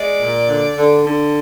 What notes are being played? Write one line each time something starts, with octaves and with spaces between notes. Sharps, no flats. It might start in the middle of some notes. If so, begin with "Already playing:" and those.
Already playing: G#3 D5
A#2
D3
D3
D3